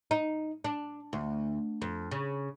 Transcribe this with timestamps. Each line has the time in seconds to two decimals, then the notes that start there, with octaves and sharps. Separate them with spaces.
0.11 D#4
0.64 D4
1.13 D2
1.82 F2
2.11 C#3